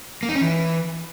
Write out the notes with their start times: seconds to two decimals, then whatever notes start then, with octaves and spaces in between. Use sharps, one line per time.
0.23 A#3
0.29 D#4
0.35 C#4
0.41 E3